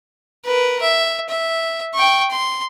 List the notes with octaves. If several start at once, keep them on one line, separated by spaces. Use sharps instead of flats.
A#4 B4
E5
E5
G5 C#6
C6